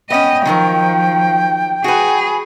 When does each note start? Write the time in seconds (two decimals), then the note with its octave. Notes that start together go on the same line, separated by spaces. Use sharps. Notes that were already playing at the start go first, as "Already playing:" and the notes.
0.10 B3 C#4 D#5 G5
0.45 D#3 F3 F#3 A#4
1.84 F#4 G#4 B4